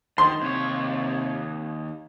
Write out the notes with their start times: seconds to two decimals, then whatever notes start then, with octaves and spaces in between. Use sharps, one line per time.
0.18 D#3 C6
0.42 D#2 C3 C#5